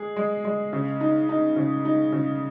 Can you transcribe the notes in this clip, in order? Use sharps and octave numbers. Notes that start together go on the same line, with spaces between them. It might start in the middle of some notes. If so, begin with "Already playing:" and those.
Already playing: G#3 G#4
G#3
G#3
C#3
D#4
D#4
C#3
D#4
C#3